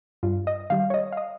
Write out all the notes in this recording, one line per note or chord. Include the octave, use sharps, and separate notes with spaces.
G2 F4
D#5
D#3 G3 F5
C#5
D#5
F5
D#5